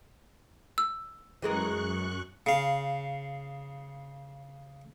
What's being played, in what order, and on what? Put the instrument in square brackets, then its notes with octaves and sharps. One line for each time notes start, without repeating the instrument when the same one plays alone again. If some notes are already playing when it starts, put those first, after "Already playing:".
[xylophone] E6
[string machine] F#2 C#6 F#6 [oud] E3 G#3 A#4
[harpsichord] C#3 F5